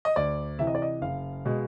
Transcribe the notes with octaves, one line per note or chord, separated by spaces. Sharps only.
D#5
D2 D5
C3 E3 E5
D#5
D5
D#5
F#1 F5
B2 G#3